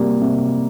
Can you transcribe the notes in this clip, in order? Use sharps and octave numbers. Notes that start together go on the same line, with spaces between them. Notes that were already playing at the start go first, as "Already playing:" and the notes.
Already playing: C3 G3 A#3
C3